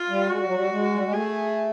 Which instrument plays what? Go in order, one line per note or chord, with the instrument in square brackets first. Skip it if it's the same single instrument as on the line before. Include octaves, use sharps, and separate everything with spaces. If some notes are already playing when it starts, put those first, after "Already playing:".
Already playing: [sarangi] F4
[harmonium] G3
[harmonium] G#3 [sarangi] F#4
[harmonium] G3
F#3
G3
G#3
G3
G#3
[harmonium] A3 [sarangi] G#4